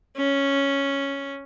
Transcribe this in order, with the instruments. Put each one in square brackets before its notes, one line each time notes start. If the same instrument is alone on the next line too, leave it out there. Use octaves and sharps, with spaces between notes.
[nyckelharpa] C#4